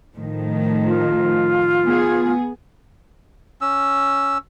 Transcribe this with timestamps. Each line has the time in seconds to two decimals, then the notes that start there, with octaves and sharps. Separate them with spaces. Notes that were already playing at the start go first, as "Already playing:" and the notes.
0.18 A2 D#3 F3
0.85 F4
1.84 B3 G#4
3.61 C#4 E6